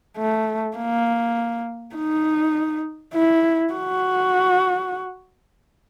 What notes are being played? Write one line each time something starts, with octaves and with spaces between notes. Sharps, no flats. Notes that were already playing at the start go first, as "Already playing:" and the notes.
A3
A#3
D#4
E4
F#4